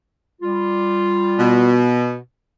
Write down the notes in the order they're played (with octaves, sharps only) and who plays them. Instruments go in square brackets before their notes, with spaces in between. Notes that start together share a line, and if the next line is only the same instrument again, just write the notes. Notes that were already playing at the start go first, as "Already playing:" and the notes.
[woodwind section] G3 F4
[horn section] B2